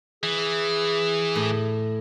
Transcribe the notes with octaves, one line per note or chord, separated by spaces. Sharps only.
E3 G#4
A2